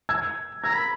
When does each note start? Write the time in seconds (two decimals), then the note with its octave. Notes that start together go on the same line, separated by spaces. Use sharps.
0.09 E6 G#6
0.64 A#5 E6 G#6
0.75 B5